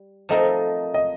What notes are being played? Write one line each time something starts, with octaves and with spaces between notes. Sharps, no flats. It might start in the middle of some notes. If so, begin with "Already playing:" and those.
Already playing: G3
F3 A3 C4 D#4 A#4 D#5
D#5